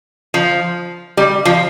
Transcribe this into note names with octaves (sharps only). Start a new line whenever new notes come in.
F3
G3
F3